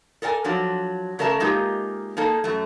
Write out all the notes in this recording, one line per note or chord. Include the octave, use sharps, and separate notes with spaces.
A4 A#4 D5 G5 G#5
F3 F#3 D4
C#3 A3 A#4 D5 E5 A5
G#3 A#3 D#4 F4 G4
A#3 D#4 G#4 A4
F#2 A3